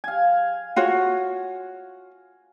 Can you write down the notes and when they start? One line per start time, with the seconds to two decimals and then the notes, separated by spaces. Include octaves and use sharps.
0.04 F5 G#5
0.76 F4 F#4 C#5